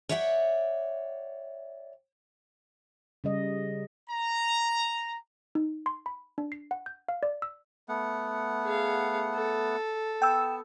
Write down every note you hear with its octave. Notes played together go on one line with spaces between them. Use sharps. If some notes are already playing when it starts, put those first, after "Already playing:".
C#5 D5 E5 F#5 G5
C#3 G3 D#5
A#5
D#4
C6
B5
D4
C7
F#5
G6
F5
D5
E6
A3 B3 F#5
G#4 F5
A4
B3 G5 E6